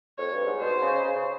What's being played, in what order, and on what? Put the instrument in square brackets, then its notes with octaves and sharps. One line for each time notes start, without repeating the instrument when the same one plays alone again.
[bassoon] F2 [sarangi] C#5
[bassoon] G2
G#2
[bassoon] B2 [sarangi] C5
[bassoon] C#3
C#3
C#3